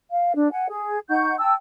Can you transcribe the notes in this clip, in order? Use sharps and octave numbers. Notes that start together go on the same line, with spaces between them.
F5
D4
F#5 G#5
G#4
D#4 F#5 C#6 G6
G5 A5 E6